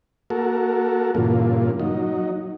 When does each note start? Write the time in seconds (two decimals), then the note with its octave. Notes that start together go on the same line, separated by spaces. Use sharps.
0.30 A#3 F#4 A4 A#4
1.15 G2 A#2 C#3 E3 A#3 F4
1.79 F#3 D#4